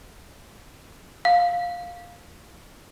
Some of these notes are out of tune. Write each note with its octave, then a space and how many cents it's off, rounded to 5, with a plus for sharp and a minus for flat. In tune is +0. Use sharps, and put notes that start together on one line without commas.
F5 +10